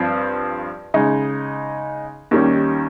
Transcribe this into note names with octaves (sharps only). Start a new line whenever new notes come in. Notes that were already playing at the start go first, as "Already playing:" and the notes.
Already playing: G2 F3 C4
C#3 G#3 D#4
D#2 D#3 G3 C#4